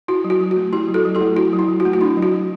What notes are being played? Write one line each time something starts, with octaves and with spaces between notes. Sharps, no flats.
E4 F#4
F#3
F#4
F#3
F#4
A3
E4 G4
F#3
F#4 A4
F#3
E4 G4
A3
E4 F#4
F#3
E4
F#3
F#4
A3
F#4
D4 E4
F#3
F#4
F#3